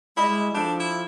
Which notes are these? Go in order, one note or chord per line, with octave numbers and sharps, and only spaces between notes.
G3 G#3 E4 D#5 B5
F3 D4 G4 A4
E4